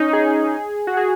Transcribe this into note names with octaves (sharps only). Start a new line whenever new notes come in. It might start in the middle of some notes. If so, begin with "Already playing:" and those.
Already playing: C#4 D#4
G#4
F#4
G#4